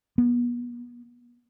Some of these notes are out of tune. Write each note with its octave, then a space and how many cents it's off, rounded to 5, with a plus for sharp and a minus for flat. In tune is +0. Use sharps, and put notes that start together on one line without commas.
B3 -35